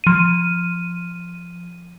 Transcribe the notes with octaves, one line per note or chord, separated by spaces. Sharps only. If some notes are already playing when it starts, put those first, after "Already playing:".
F3 D#7